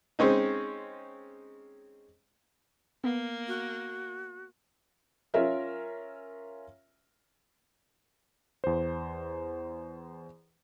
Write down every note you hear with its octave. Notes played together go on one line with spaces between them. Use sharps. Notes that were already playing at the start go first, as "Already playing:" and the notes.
G#3 C4 C#4 D#4
A#3 B3
F#4
C#4 F4 A#4 E5
E2 C5